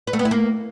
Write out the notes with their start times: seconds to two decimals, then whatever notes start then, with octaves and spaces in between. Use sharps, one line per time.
0.07 B4
0.13 A3
0.19 B3
0.25 E4
0.31 A#3